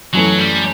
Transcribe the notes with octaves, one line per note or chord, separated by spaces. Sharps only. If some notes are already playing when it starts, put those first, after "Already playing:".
F#2 E3 F#3 A3
G3